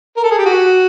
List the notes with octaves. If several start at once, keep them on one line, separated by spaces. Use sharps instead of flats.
A#4
A4
G#4
G4
F#4